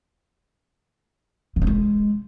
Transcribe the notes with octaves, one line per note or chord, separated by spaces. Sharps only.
D#3
A3
G#3